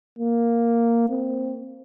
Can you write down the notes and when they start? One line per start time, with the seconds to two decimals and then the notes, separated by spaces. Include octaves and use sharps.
0.19 A#3
1.10 C4